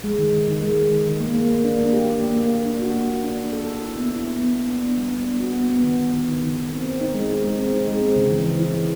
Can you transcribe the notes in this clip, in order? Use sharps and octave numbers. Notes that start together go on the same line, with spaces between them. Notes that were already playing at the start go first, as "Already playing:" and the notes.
G#3
D#3
D#3
D#3
G#3
D#3
D#3
D#3
A#3
A#3
A#3
D4
A#3
G4
G4
A#3
A#3
A#3
D4
F#4
A#3
F#4
D4
D4
A4
A4
E4
B3
E4
E4
B3
B3
D4
B3
G3
D4
B3
F#4
B3
B3
D#3
D#3
D#3
D#3
D#3
D#3
C4
C4
D#4
G#3
D#4
G#3
C4
D#4
G#3
C4
C#3
E3
E3
E3
E3